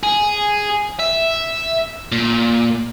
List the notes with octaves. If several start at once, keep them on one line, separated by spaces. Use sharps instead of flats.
G#4
E5
A#2